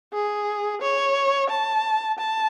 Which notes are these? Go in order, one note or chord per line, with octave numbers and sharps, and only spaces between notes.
G#4
C#5
A5
A5